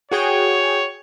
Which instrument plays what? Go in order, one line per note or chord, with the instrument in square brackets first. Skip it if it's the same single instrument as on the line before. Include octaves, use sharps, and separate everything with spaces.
[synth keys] F#4 G#4 G5 [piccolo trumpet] C#5